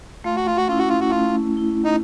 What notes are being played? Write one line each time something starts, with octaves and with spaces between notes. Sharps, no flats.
A3 F4
F#4
F4
F#4
C#4 E4 F4
F#4
F4
F#4
A3 F4
C#4 E4
D#4